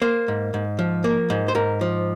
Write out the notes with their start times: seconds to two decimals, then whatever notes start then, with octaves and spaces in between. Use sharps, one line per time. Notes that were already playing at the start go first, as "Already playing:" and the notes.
0.02 A#3 C5
0.28 G#2
0.54 G#2
0.79 F3
1.04 A#3
1.30 G#2
1.48 C5
1.55 G#2 A#4
1.81 F3